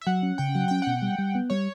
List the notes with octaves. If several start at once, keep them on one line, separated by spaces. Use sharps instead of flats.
E5
F#3 F#5
C#4
C#3 G5
F#3 F#5
C#4 G5
B2 F#5
G3
G3
B3
G3 C#5